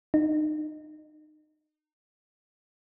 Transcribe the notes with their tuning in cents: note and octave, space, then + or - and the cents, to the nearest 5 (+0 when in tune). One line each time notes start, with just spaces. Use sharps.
D#4 -30